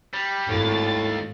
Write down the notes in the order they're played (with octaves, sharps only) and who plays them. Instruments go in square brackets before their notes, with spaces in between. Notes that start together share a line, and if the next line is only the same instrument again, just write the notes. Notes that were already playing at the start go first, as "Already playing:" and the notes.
[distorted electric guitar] G3
[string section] G#1 A6 [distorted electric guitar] D#2 [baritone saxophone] A2